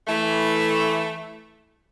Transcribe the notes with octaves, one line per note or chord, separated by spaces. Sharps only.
E3 A3